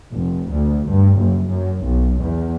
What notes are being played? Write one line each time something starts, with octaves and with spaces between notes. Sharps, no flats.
F1
D2
G2
F#1
F#2
B1
E2